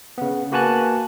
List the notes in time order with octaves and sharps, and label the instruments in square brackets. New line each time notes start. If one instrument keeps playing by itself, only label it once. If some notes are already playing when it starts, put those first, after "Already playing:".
[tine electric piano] C#3 B3
A#3 F#4 B4 G#5 A5 F#6